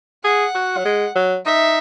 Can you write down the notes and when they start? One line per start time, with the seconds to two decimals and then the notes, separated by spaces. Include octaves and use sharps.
0.24 G#4 F#5
0.55 F#4
0.77 F#3
0.85 G#3
1.16 F#3
1.46 D#4 E5